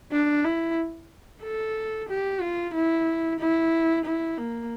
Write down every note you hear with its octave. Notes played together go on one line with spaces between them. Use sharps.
D4
E4
A4
G4
F4
E4
E4
E4
A#3